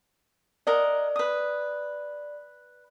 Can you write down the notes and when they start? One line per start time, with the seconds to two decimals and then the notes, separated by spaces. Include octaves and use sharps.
0.67 A#4 D5 D#5 F#5
1.16 B4 D#6